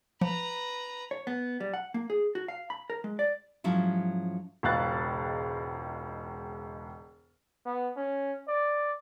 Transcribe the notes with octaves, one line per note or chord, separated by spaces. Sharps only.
F3 B4 A#5
C#5
B3
G3
F#5
A#3
G#4
F#4
F5
B5
A#4
G#3
D5
G#2 F3 F#3 C#4 E4
E1 C#2 G#2 F5 F#6 A6
B3
C#4
D5